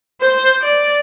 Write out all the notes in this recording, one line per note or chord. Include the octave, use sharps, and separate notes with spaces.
C5
D5